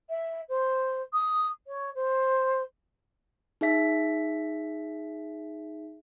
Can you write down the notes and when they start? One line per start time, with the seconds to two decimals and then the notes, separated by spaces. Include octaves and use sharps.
0.09 E5
0.48 C5
1.13 D#6
1.67 C#5
1.95 C5
3.61 D#4 G#4 E5 B6